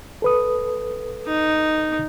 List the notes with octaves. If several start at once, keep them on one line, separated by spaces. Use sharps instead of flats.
A4 B4 D#6
D#4